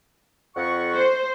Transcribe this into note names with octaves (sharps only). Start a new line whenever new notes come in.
F2 F#5 C#6
C5